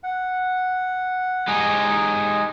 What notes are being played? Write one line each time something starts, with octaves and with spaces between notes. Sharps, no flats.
F#5
G#3 D#4 G4 D#5 G#5